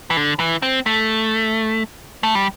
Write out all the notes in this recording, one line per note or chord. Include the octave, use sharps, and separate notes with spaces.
E3
D3
E3
C4
A3
A3
G3